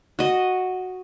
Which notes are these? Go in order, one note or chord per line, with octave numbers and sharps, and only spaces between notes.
F#4 D#5